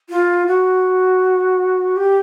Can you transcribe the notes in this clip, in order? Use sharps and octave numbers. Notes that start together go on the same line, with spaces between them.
F4
F#4
G4